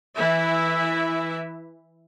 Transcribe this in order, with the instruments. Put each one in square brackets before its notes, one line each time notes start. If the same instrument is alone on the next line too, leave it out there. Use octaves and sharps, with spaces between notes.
[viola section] E3 E4 E5